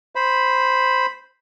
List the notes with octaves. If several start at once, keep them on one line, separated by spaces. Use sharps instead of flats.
C5 B5